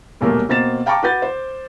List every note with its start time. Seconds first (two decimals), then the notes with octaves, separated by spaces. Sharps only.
0.21 D#1 B1 A3 A#3 A#4
0.49 B2 A#3 C4 A6 E7
0.86 F5 G5 A5 A#5 C#6 D6
1.03 F#4 B4 G6 A6
1.22 C5